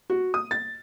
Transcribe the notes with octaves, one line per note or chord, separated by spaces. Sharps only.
F#4
D#6
A6